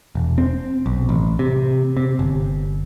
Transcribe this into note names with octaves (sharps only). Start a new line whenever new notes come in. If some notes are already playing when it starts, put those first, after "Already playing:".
E1
C4
B1
A1
C3
C3
G1